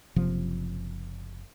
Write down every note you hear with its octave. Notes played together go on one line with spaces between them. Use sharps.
F#1 C3 F3